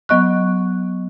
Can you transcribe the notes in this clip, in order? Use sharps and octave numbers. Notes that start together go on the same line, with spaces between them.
F#3 B3 D#5 C#6 F#6